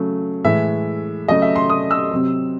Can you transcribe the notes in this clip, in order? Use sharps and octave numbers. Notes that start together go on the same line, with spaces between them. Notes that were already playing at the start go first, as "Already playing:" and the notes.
Already playing: C#3 F#3 A3
A2 E3 G#3 E5
C#3 F#3 A3 D#5
E5
C6
D#6
E6
C3 F#3 C4